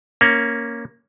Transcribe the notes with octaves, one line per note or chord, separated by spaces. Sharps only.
A#3 C#4